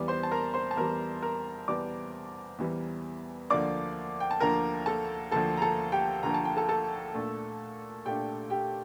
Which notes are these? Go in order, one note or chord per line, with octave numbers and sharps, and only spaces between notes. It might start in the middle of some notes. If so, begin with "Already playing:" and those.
Already playing: E2 E3 G3 D5
C5 C6
A5
A#4 A#5
C5 C6
A5
E2 E3 G3 A#4 A#5
A#4 A#5
E2 E3 G3 D5 D6
E2 E3 G3
D2 D3 F3 A#3 D5 D6
G5
A5
D2 D3 F3 A#3 A#4 A#5
A4 A5
D2 D3 F3 A#3 A4 A5
A#5
A4 A5
G4 G5
D2 D3 F3 A#3 A#5
A5
G5
A4 A5
A4 A5
A#2 A3 D4
A#2 A3 D4 G4 G5
G4 G5